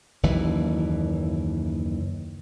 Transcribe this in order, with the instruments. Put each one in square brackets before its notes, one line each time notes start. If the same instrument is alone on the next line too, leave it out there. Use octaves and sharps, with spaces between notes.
[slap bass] F#1 D#2 E3